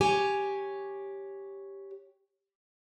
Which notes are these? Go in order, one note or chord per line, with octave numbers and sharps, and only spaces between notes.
G4 C#5 G#5